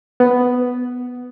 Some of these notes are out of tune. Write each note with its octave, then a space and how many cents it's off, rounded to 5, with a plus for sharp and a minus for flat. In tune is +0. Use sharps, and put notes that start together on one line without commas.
B3 +5